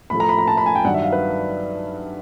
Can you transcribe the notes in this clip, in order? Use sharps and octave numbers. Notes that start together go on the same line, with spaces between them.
A2 F3 A3 B5
A#5
B5
A#5
A5
B5
G#5
G5
G2 D#3 F#3 F#5
E5
F5
B4